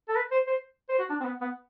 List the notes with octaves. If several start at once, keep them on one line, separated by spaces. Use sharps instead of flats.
A4
B4
C5
C5
C5
F#4
D4
C4
B3
B3